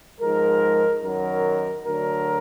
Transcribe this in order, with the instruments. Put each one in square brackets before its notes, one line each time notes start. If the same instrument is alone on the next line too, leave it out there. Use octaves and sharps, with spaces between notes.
[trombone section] G#2 F3 G#3 A#4
F#2 D#3 F#3 A#4
D2 D3 F#3 A#4